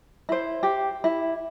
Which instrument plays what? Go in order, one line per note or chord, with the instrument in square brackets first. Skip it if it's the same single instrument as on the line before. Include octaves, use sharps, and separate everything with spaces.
[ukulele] E4 C5
G4
E4